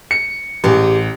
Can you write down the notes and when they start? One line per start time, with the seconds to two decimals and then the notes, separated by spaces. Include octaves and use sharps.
0.11 C#7
0.64 A1 G4 G#4